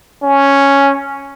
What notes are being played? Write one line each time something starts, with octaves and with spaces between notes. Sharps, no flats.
C#4